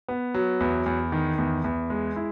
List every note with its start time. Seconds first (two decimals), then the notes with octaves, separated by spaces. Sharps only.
0.08 B3
0.34 F#3
0.61 E2
0.86 E2
1.12 D#3
1.38 E2
1.64 E2
1.90 G#3
2.16 E4